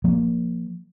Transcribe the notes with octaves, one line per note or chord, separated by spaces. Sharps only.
F3 A#3